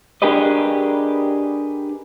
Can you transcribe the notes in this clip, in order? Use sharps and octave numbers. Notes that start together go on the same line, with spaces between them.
D4 G4 G#4 A#4 B4 D#5